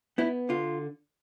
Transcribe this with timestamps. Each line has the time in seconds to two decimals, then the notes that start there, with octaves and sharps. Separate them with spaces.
0.18 B3 E4
0.49 D3 F4